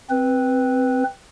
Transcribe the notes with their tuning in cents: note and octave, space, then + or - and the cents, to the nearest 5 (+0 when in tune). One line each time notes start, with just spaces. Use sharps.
C4 +0 B4 +0